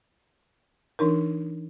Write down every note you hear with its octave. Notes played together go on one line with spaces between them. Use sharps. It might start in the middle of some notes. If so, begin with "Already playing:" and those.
E3 D4 D#4 A#4